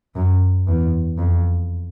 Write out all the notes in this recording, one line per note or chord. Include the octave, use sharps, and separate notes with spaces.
F#2
E2
F2